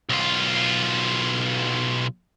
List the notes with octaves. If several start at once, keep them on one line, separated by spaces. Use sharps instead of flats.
B1 F4